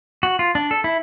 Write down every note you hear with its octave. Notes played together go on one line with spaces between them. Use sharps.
F#4
F4
D4
A4
E4